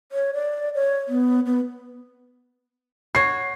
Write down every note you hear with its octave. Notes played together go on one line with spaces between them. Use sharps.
C#5
D5
C#5
B3
B3
F#4 C#5 C7